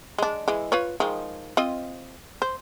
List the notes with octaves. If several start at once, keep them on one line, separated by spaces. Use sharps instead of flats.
G#3 D4
E3 G#3
F4 B4 C#5
D#3 F3 G#3
C4 F4 D#5
C5